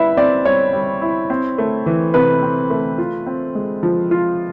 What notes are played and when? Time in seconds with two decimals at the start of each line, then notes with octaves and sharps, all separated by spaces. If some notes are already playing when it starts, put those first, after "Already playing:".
Already playing: G3 E4 B4 E5
0.17 C4 D5
0.45 G3 C#5
0.73 G3
1.02 E4
1.30 C4
1.58 A3
1.86 E3
2.14 C3 B4
2.42 C4
2.70 A3
2.98 F4
3.27 C4
3.55 G#3
3.83 F3
4.11 F4